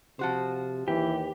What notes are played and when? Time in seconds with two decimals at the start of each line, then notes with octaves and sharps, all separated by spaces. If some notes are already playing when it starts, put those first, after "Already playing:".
0.19 C3 F3 F#4 C5
0.88 D#2 E3 G4